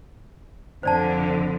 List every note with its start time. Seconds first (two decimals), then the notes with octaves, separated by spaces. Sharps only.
0.83 F2 D3 C5 D5 A5